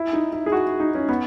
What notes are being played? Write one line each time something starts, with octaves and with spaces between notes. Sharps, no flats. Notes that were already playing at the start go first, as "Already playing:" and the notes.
Already playing: E4
D#4
E4
G#4
F#4
D#4
C#4
B3